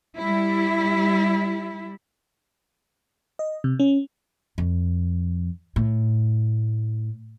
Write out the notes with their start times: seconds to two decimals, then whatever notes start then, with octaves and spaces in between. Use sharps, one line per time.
0.16 G3 E4
3.39 D#5
3.64 C3
3.79 C#4
4.58 F2
5.76 A2